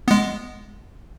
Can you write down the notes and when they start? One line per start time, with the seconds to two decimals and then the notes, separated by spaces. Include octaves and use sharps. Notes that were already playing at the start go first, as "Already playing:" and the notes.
0.08 G#3 B3